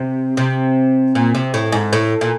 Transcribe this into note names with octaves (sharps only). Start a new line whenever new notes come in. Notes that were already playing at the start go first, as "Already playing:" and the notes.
Already playing: C3
C3
A#2
C3
A2
G#2
A2
A#2